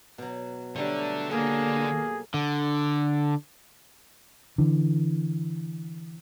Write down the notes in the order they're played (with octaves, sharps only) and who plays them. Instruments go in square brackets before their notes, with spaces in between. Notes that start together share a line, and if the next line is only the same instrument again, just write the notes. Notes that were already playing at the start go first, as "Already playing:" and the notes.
[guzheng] B2 F#3
[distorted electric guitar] D3 D4 [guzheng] F#3 G3 [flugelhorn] A3
[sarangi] A#3 [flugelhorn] G#4 [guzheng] A4
[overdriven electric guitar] D3
[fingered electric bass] D3 E3